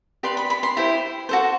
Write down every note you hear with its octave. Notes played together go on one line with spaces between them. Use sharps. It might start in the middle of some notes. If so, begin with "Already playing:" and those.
G4 B4 D5 C6
B5
B5
C6
E4 G4 C5
F#4 A4 C5